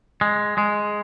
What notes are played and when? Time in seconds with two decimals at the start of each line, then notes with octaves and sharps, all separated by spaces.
0.21 G#3
0.58 G#3